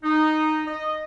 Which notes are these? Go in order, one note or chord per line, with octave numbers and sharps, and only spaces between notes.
D#4
D#5